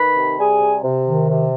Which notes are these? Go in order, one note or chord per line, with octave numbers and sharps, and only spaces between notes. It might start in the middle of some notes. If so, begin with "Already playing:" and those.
Already playing: D#3 B4 B5
C3
G3 G#4 G#5
C3
C3
D#3
C3